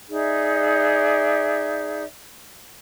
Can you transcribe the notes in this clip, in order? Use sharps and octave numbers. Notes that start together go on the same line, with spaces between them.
D#4 G#4 D5 E5